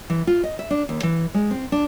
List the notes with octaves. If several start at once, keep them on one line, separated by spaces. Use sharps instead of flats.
E3
F4
D#5
E5
D4
D#2
E3
G#3
C4
D4